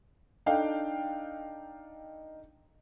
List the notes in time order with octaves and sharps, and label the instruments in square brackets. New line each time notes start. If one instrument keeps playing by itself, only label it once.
[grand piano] D4 D#4 A4 F5 G5